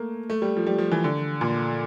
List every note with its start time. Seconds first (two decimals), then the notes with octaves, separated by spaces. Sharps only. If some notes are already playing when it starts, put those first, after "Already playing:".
Already playing: A3 A#3
0.30 A3
0.42 G3
0.57 F3
0.67 G3
0.78 F3
0.92 E3
1.04 D3
1.41 A#2